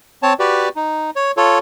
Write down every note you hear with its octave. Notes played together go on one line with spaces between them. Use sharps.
C4 C#5 A5
F#4 G4 B4 D5
D#4
C#5
F4 A4 C#5